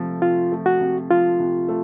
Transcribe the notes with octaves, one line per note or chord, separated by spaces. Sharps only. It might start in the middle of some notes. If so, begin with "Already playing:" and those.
Already playing: C3 F3 A3
C3 F4
A3
F#4
C3
F3 F4
C3
A3